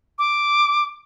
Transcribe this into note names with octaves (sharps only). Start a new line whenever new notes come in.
D6